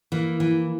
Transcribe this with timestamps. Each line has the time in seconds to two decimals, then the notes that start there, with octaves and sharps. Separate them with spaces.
0.12 E3 A#3
0.40 E3